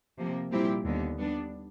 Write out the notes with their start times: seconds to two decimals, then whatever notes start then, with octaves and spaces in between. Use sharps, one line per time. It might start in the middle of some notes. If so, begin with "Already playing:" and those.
0.18 C3 F3 A#3
0.51 A#2 G3 C4 E4 G4
0.85 D#2 D3 G3 B3
1.18 G3 B3 D4